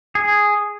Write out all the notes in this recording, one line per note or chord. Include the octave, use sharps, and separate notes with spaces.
G#4